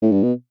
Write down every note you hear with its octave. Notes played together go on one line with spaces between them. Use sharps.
A2
G2
B2